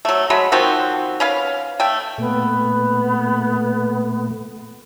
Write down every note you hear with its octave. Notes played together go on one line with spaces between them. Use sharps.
F#3 A3
F#3 G#3 A3 B5
D#3 F3 C4 F#4
C#4 B4 F5
A3 G5
A#2 A3 B3